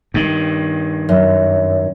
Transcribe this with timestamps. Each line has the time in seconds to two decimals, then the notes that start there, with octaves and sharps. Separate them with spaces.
0.14 G2 D#3
1.09 F#2